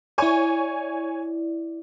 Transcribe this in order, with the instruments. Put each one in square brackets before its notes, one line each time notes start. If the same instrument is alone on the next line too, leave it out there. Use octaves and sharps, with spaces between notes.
[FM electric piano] E4 D5 [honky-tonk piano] C#5 G#5 C#6